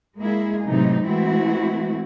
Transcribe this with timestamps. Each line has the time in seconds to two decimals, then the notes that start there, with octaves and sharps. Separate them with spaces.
0.20 G#3 A#3 E4 G#4
0.66 A2 C3 E3 F#3 D#4
1.05 E3 G#3 A3 C4 E4 F#4